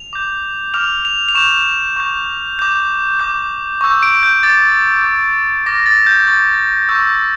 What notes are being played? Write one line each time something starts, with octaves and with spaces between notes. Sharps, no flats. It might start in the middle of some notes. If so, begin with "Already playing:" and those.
Already playing: F7
D6 G6
D6 F6 F7
F7
F7
C#6 G6 E7
C#6 G6
D6 G6
D6 G6
C#6 E6 G6
D7
G6
D6 G6 A6
D6 G6
D6 F6 A#6
A6
G6
C#6 G6 A6
C#6 E6 G6